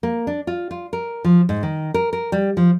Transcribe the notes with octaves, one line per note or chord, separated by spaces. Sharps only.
A#3
D4
F4
F4
A#4
F3
G#2
D#3
A#4
A#4
G3
F3